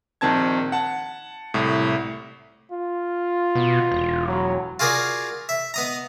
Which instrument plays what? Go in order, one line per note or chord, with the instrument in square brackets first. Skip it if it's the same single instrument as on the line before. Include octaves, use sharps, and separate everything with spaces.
[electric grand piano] A#1 D#3 C4 A5 G#6
F#5 A5
C2 A2
[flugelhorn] F4
[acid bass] B2
E1
[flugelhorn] F#3
[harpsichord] F4 F#4 G#4 A#4 D5
E5
B3 D#5 A#5